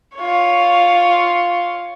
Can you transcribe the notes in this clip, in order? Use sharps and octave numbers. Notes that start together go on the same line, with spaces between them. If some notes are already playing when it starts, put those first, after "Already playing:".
F4 C#5